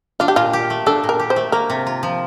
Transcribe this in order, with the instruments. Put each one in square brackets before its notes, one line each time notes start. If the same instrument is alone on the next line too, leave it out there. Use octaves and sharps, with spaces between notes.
[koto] D4 [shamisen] F4
[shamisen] G4
[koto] A#2 [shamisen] F4
[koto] G4
A3
[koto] D4 [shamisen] A4
[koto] A#2
[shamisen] A#4
[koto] G4
[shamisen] C5
[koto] A3
[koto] A#3 [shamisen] A#4
[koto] C3
F4
F3